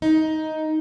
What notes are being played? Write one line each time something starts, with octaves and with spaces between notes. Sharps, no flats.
D#4